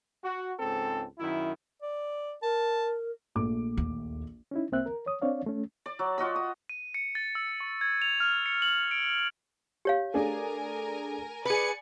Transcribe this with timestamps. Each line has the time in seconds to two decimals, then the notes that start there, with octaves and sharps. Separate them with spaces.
0.24 F#4
0.59 C#2 G#2 C4 A4
1.19 F#2 D#3 E4
1.82 D5
2.42 A#4 A5
3.35 A#1 A3 D6
3.77 D#2
4.51 C#4 D#4 E4
4.72 C2 A#3 C4 E5 F#6
4.86 A#4
5.06 C#5 D#6
5.22 C4 D4 C#5 D5 F5
5.46 A3 C#4
5.86 D5
5.99 F#3
6.18 F4 F#4 D#5 E6
6.36 D#6
6.69 D#7
6.94 C#7
7.15 A6
7.35 E6
7.60 C#6
7.81 G#6
8.02 F7
8.20 F6
8.46 C#7
8.62 F#7
8.91 D7
9.85 G4 C#5 F5
10.14 A3 D4 G#4 A#4 G#5
11.45 G#4 B4 D5 G#5 C#7